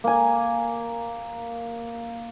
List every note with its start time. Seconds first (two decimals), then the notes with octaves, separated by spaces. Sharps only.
0.04 A#3 G#5